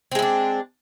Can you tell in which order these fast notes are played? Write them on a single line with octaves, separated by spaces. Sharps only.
C4 G#3 E4 D4